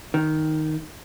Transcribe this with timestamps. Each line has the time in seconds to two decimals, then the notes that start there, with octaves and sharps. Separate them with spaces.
0.14 D#3